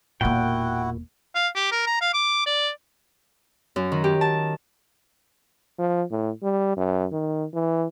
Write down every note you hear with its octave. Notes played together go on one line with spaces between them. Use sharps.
E1 A#2 A#3 E4 F#4 F#5 G5
F5
G4
A#4
A#5
F5
D6
D5
F#2
D#3
G4
A5
F3
A2
G3
F#2
D#3
E3